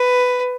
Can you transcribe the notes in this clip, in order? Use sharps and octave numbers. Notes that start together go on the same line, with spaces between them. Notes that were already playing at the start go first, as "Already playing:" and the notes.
Already playing: B4